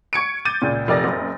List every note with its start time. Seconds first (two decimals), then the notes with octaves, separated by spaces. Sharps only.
0.13 C#6 G#6 C#7 D7
0.45 D6 G6 A6 D#7
0.62 C#2 A#2
0.88 F1 A#4 D5 A6 A#6
1.04 F#1